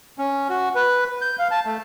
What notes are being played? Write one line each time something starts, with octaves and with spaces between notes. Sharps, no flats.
C#4
F#4
B4
G6
F5
A5
A3